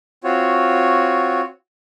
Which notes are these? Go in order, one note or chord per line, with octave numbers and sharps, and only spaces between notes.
C4 F4 F#4 C#5